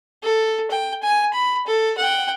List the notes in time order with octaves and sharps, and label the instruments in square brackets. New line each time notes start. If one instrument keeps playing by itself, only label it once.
[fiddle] A4
G5
G#5
B5
A4
F#5 G5